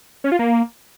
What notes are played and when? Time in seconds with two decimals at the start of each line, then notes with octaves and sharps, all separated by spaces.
0.24 C#4
0.32 F4
0.39 A#3